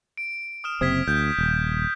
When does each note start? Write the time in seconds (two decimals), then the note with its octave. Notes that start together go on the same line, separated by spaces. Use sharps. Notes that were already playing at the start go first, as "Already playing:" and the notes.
0.17 D7
0.64 D#6 F6 E7
0.81 F#1 C3 C4 D#6 G#6 B6
1.08 D2 G6
1.38 D#1